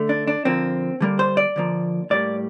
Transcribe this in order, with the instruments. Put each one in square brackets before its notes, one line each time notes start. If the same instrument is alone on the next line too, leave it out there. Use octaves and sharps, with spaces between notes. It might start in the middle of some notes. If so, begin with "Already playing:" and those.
Already playing: [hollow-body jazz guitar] D3 A3
D4
D4
D3 F3 A#3 C4
D3 G3 A#3
C5
D5
D3 F3 A#3
A2 G3 A#3 D5